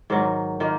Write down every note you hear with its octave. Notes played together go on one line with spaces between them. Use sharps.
G#2 D#3 F#3
D#3 A#3 F4